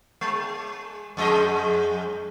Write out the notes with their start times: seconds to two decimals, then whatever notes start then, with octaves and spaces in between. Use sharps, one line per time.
0.21 G#3
1.17 F2 G#3 D#5